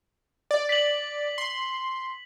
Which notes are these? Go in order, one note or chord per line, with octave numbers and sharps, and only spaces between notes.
D5
B6 F#7
C6